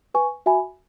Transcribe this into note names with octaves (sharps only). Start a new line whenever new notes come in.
B4 G#5 C#6
F#4 E5 G#5 B5